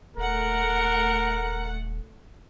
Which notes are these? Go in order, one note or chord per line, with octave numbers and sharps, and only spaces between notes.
D#1 A3 A#4 F#5